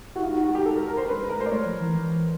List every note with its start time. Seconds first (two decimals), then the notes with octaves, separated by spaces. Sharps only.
0.16 E4 F#4
0.22 D#4 F4
0.33 F#4
0.44 F#4
0.55 G4
0.66 A4
0.76 A#4
0.87 A#4
0.97 C5
1.08 D4 B4
1.17 G3
1.23 G#3
1.29 A#4
1.37 A3 C5
1.46 D5
1.51 A3 C#5
1.65 F3
1.79 E3
1.93 E3